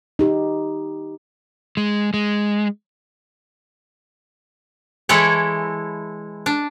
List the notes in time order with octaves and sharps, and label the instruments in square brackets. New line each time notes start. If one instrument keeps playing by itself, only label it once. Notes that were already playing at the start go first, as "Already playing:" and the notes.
[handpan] D#4 G4
[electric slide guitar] G#3
G#3
[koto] E3 G#3 E4 A4 C#5
D4